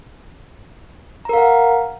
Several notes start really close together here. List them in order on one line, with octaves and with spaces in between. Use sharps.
A#5 A#4 F5 F#5